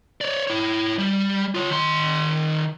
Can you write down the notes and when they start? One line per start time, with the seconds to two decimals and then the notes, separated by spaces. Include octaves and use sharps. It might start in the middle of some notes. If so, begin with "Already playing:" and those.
0.21 C#5 D5
0.47 E4 C#5
0.99 G3
1.55 F4 C#5
1.70 D#3 C6